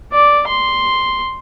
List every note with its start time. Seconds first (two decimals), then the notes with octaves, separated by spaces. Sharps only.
0.13 D5
0.47 C6